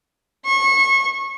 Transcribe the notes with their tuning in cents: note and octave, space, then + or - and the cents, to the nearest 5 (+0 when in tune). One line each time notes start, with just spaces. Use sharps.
C#6 -30